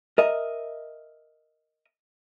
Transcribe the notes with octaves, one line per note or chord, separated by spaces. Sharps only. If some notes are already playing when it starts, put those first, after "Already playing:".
A#4 D#5 E5